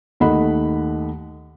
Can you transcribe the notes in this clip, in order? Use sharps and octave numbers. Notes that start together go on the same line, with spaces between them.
D#2 D#3 A3 D#5 F#5 B5